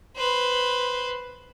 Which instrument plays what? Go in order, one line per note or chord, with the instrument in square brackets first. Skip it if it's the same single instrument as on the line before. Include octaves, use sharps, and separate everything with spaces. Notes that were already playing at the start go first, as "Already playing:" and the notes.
[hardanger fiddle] B4 C5